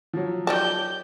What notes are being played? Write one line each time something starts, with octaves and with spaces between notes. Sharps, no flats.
F3 F#3
D#3 G3 G4 A5 G6